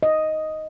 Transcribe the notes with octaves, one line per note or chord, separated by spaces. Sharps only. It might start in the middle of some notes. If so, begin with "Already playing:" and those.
D#5